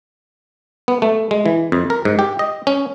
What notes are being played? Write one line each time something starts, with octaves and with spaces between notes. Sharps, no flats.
B3
A3
G#3
E3
F2
A#4
G#2
G4
D#5
C#4